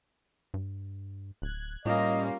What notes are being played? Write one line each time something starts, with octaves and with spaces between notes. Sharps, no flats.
G2
D1 F#6 G#6
A2 G3 A#3 C#4 F4 D#5